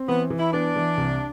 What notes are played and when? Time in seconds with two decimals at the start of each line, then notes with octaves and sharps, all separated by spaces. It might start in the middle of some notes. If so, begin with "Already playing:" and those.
Already playing: C4
0.08 E3 B3
0.30 E3
0.38 E4
0.53 B3 D4
0.76 E3
0.98 C2